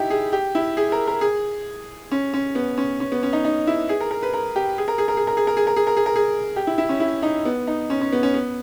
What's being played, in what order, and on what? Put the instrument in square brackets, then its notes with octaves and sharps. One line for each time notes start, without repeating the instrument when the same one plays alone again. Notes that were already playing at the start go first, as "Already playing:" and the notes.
Already playing: [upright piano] D#4 E4 G4
G#4
G4
E4
G#4
A#4
A#4
G#4
C#4
C#4
B3
C#4
C#4
B3
C#4
D#4
D#4
E4
G#4
A#4
A#4
B4
A#4
G4
G#4
A#4
G#4
A#4
G#4
A#4
G#4
A#4
G#4
A#4
G#4
A#4
G#4
A#4
G#4
G4
E4
E4
C#4
E4
D#4
B3
D#4
C#4
C#4
B3
C#4
B3